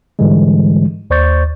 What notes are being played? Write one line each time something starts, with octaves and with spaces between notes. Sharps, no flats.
G#2 D3 E3 G3 G#3
D#2 C5 D5 C#6 G6 A6